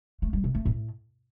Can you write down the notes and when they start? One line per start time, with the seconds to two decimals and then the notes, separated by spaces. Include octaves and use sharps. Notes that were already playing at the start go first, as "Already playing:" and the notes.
0.22 A3
0.33 G3
0.44 C3
0.55 A3
0.65 A2